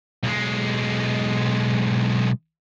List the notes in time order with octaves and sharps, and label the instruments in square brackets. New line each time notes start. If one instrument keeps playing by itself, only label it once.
[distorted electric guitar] B1 G#3